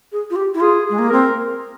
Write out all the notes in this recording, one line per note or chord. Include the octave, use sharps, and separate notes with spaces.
G#4
F4
G4
E4
F4 G#4
G#3 G#4
A#3
C4 A#4